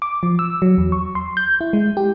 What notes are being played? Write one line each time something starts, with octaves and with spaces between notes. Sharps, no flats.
D6
F3
E6
F#3
E2
C#6
C6
G6
E4
G#3
G4